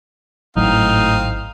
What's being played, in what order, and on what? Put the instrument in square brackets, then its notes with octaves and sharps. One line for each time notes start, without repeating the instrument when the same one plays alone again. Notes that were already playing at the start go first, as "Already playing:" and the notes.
[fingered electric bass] G#1 F#3 [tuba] A2 [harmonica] C4 F5 [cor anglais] D#4